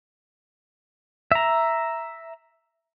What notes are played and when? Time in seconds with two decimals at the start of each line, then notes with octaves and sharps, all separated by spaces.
1.32 E5 A#5